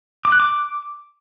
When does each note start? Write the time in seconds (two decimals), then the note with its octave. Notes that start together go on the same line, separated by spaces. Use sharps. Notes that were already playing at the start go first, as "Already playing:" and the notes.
0.25 D6
0.32 F#6
0.40 D6